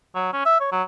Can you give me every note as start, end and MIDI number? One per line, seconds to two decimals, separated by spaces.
0.15 0.29 54
0.33 0.41 61
0.46 0.59 76
0.60 0.69 73
0.72 0.83 54